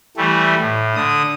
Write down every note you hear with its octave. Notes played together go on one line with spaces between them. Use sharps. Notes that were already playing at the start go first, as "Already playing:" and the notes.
E3 G3 A3
A2
D3 D#6